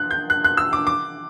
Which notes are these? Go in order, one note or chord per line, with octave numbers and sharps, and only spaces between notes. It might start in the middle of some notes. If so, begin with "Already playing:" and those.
Already playing: F#6
G6
F#6
F#6
E6
D6
D6